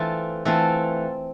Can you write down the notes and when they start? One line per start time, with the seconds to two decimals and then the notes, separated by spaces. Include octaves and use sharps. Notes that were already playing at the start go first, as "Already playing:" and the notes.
Already playing: E3 A3 C4 F4 A4
0.45 E3 A3 C4 F4 A4